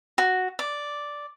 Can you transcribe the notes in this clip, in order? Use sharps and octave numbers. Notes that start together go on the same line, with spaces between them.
F#4
D5